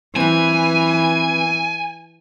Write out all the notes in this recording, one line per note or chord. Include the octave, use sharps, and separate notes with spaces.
E3 C4 B4 G#5